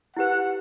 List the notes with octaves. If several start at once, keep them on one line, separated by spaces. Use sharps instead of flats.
E4 G4 B4 F#5